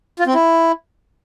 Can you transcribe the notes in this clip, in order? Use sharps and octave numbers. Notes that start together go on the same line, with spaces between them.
F4
C4
E4